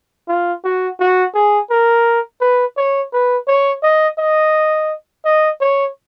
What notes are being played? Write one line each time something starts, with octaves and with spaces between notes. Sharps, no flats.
F4
F#4
F#4
G#4
A#4
B4
C#5
B4
C#5
D#5
D#5
D#5
C#5